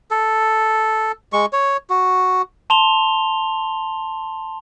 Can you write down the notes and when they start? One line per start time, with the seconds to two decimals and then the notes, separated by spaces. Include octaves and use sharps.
0.11 A4
1.33 G#3 C#6
1.53 C#5
1.90 F#4
2.70 A5 C6 F7 G7